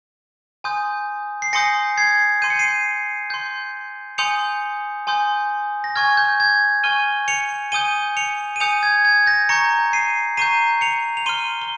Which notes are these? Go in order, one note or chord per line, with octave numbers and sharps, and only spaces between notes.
G#5 C6 D#6 G6
C7
G#5 C6 D#6 G6 A#6 C#7
G#6 C7
C6 G6 D#7
C#7
C7 D#7
C6 G6
G#5 C6 D#6 G6 C#7 F7
G#5 C6 D#6 G6
A#6
G#5 C#6 F6 G#6
G6
G#6
G#5 C#6 F6 D#7 G7
C#7 F7
G#5 D#6 G6 D#7 G7
C#7 F7
D#7
G#5 D#6 G6 C#7 F7
G#6
G#6
G6 A#6
A#5 C#6 G6 A#6 C#7
C7 D#7
A#5 C#6 G6 C7 D#7
C#7 F7
F7
C6 F6 D#7 G7
G7